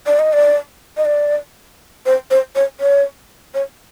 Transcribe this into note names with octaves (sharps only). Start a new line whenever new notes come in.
D5
D#5
D5
D#5
D5
C5
C5
C#5
C#5
C#5